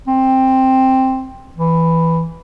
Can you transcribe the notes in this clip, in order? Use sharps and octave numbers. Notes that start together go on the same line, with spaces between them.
C4
E3